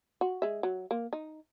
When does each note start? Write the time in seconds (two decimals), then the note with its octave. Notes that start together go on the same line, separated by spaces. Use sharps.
0.21 F#4
0.42 G#3 E5
0.63 F#3
0.91 A#3
1.13 D#4